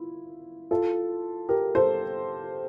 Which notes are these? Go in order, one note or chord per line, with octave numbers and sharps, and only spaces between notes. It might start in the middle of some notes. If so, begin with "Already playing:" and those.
Already playing: E4 F4
F4 A4
G4 A#4
A4 C5